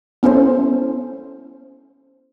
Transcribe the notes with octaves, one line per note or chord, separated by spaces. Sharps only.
B3 C#4 E4 A4 C5